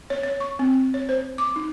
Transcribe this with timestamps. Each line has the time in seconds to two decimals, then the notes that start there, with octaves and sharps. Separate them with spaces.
0.10 C#5
0.24 C#5
0.40 C#6
0.59 C4
0.94 C#5
1.09 C5
1.38 D6
1.56 D#4